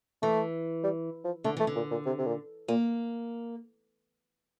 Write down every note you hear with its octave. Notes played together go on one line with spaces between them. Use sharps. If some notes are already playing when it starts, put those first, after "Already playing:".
E3 A3
G3
F3
D3 A3
E3 A3
D3
A#2
A#2
C3
C3
A#2
A#2 A#3